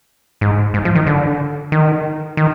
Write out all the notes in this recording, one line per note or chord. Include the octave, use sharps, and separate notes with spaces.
G#2
G#2
F3
D#3
D3
D#3
D#3